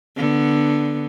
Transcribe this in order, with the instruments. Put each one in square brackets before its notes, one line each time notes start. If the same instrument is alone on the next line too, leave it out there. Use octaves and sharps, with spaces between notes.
[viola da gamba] D3 B3